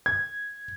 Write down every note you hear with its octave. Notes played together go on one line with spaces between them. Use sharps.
G#6